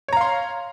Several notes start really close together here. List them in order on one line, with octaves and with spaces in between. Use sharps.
C#5 A#5 F5 C6